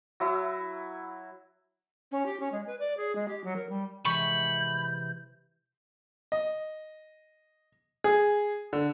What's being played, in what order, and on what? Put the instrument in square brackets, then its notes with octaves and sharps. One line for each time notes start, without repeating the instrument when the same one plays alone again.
[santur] F#3 E4
[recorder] C#4
G4
C#4
G#3
B4
D5
G#4
G#3
G4
F#3
A#4
G3
[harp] C3 E3 G#3 [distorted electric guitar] B5 [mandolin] C#6 [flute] G6
[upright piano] D#5
G#4
D3